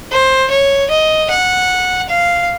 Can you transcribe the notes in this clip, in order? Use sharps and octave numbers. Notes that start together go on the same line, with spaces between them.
C5
C#5
D#5
F#5
F5